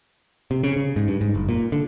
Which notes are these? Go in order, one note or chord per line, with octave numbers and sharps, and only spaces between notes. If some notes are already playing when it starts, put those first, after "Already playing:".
C3
C#3
C#3
G#2
G2
G#2
F#1
A#2
D3